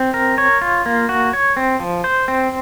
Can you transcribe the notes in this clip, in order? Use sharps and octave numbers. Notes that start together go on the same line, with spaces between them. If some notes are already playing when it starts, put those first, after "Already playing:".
Already playing: C4
A#4
C#5
F4
A#3
F#4
C#5
C4
F3
C5
C4